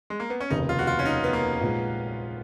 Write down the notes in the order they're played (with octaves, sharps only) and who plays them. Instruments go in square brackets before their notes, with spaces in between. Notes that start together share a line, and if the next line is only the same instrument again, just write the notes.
[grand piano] G#3
A#3
B3
C#4
[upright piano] F1 D#2 C#3 [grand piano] D#4
[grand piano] F4
F#4
F4
C#4
D#4
B3
A#3
[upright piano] A#1 A#2 G#3